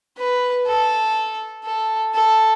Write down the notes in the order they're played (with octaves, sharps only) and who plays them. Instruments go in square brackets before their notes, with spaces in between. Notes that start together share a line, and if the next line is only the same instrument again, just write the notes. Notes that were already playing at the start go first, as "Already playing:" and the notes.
[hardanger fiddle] B4
A4
A4
A4